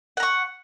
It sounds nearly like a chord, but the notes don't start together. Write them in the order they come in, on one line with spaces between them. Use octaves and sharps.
F#5 A#5 C#6